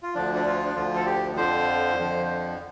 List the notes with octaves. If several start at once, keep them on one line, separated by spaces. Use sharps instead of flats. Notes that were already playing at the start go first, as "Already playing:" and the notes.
F4
D2 D3 F3 D4
D4
F4
D4
D2 D3 F3 F4
A4
G4
F2 D3 F3 C5
F2 D3 F3